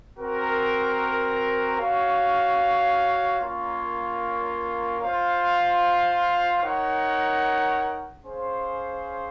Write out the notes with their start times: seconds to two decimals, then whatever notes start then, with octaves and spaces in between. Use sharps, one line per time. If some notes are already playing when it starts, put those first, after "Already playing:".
0.18 C4 F#4 A#4
1.78 F#4 C#5 F5
3.40 A#3 C#4 F4 A#4 C#5
5.00 F4 C5 F5
6.61 D#4 A#4 C#5 F#5
8.22 C#4 G#4 C5 F5